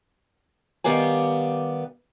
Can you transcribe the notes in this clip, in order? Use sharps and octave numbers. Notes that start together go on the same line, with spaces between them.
D#3 G3 B3 G4 F5 G#5